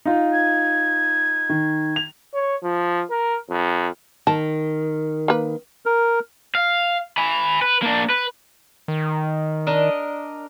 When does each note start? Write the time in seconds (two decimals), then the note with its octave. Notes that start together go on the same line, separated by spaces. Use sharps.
0.05 D#4 F4
0.33 G#6
1.49 D#3
1.96 F7
2.34 C#5
2.63 F3
3.11 A#4
3.50 F2
4.27 D#3 A5
5.28 A#3 B4
5.86 A#4
6.55 F5
7.17 G#5 B5
7.62 B4
7.82 A#3 D4
8.10 B4
8.88 D#3
9.67 D4 A#4 D#5